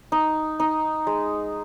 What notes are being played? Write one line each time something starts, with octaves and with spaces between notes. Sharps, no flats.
D#4
D#4
G#3